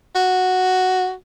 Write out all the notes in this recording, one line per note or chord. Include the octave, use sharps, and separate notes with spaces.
F#4